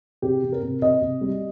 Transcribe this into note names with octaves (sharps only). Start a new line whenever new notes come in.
C3 G4
C3
A#4
C3
C3 D#5
C3
G3